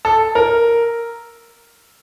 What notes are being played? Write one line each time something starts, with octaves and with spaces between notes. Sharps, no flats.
A4
A#4